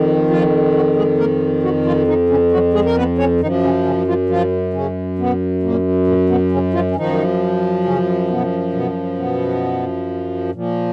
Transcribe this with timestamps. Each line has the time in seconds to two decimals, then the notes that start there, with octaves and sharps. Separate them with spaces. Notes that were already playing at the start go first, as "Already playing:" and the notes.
Already playing: F2 D#3
0.30 F3 F4
0.74 F#3 F#4
0.96 G#3 G#4
1.19 A#3 A#4
1.63 F#3 F#4
1.85 F3 F4
2.07 D#3 D#4
2.29 C#3 C#4
2.52 F#3 F#4
2.74 G#3 G#4
2.85 A#4
2.97 B3 B4
3.18 C#4 C#5
3.40 F#2 D#3 D#4
3.44 F3
3.63 C#3 C#4
3.85 C#3 C#4
4.07 F3 F4
4.29 F3 F4
4.73 C#3 C#4
5.18 B2 B3
5.63 A#2 A#3
6.07 A#2 A#3
6.29 B2 B3
6.52 C#3 C#4
6.73 F3 F4
6.91 C#4
6.95 F#2 D#3 F3 D#4
7.84 C#3 C#4
8.29 B2 B3
8.73 B2 B3
9.18 B2 B3
10.51 A#2 F3